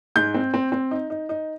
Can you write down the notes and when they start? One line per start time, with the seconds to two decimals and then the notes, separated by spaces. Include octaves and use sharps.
0.16 G#2 G6
0.34 C4
0.54 C4
0.72 C4
0.91 D#4
1.10 D#4
1.29 D#4